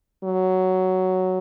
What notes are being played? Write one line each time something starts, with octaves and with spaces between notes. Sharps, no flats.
F#3